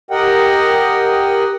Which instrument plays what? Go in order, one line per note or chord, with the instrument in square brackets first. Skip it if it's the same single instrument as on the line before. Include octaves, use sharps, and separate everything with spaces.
[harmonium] G4 A#4 D#5 F#5 G5